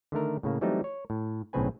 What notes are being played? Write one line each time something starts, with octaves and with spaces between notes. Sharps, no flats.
D3 D#3 A3 A#4
A2 C#3 A#3
E3 F#3 G3 A3 C4 D#4
C#5
A2
B1 A2 C#3 C4 B4 G#5